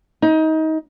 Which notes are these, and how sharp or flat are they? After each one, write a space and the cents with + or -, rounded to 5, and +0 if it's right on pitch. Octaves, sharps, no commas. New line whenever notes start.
D#4 +25